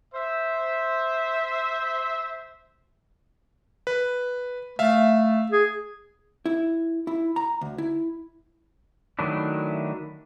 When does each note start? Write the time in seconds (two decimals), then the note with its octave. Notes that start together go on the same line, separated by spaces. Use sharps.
0.13 C5 E5
3.87 B4
4.79 A3 E5 F5
5.52 G#4
6.46 E4
7.07 E4
7.36 A#5
7.61 D2
7.78 E4
9.19 D#3 F#3 A3 D4 E4